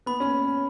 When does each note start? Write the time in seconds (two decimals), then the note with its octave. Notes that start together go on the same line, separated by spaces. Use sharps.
0.06 B3 B5
0.20 C#4